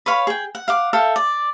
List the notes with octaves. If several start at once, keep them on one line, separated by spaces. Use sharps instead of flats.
B4 C#5 F5 B5
G#4 G5
F#5
F5 F#5 D6
A4 E5 F5 G5
D5